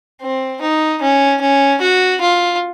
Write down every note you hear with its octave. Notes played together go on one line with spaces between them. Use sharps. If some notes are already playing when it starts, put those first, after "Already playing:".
C4
D#4
C#4
C#4
F#4
F4